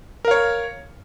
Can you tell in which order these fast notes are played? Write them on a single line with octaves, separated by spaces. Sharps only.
A#4 F5 C#5